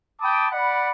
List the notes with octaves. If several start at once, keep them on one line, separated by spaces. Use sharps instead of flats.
G5 A5 B5 D6 D#6
D5 F#5 B5